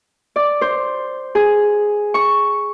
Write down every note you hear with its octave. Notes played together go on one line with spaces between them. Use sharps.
D5
C5
G#4
C#6